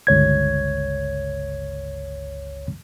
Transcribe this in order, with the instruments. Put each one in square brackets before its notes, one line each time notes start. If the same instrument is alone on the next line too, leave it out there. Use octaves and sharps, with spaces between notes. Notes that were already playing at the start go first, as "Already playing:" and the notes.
[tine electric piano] G1 C#2 C#5 G#6